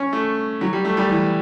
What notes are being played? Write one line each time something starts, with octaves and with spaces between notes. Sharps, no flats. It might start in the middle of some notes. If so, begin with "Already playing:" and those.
Already playing: C#4
A3
F#3
G3
A3
G3
E3